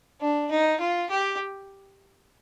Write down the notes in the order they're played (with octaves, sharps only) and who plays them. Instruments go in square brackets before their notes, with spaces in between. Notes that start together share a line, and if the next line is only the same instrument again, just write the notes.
[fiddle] D4
D#4
F4
G4